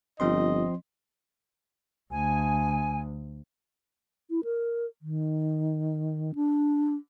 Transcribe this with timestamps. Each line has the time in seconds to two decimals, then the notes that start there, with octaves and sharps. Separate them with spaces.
0.20 G1 F3 C4 D#5 C6
2.12 D2 G#5
4.29 E4
4.44 A#4
5.02 D#3
6.35 D4